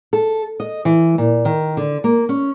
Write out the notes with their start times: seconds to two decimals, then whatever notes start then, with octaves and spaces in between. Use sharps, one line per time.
0.13 A4
0.60 D#5
0.85 E3
1.18 A#2
1.45 D#3
1.77 D3
2.04 A#3
2.29 C#4